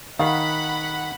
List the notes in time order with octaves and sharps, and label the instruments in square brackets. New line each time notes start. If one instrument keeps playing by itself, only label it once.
[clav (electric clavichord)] D#3 [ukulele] F5 [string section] F#5 B5